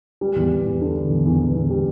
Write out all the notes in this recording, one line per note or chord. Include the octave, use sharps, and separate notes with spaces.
G3
E2
E2
E2
D3
D3
E2
E2
E2
E2
G3